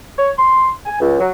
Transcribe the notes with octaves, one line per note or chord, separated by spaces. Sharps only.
C#5
C6
G#5
C#2
F#3